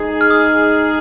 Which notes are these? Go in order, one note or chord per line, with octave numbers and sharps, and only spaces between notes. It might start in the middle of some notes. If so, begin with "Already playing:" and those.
Already playing: G#3 D#4 G#4
F6
D#6